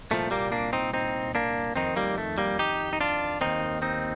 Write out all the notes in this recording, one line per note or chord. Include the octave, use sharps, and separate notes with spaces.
C2 A#2 F3 A3
G3 A#3
A#3 D4
C4 D#4
C4 D#4
A#3 D4
F2 D#3 C4 D#4
G3 A#3
A3
G3 A#3
D#4 G4
D#4
D4 F4
D#2 D#3 C4 D#4
C4 D#4